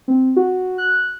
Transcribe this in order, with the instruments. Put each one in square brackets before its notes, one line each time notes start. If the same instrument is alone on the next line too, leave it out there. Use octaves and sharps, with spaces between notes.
[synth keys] C4
F#4
F#6